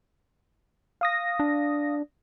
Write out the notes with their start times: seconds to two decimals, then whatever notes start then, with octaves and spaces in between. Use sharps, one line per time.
1.01 F5 D#6 A#6
1.40 D4